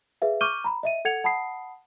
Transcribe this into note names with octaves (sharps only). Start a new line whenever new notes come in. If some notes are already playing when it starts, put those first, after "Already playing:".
G#4 B4 E5 F5
C#6 D6 F6 G6 D#7 G7
A#5 B5
D#5 E5 D#7
A4 F#5 G#6 C#7 F7
F#5 A5 B5 D#6 C7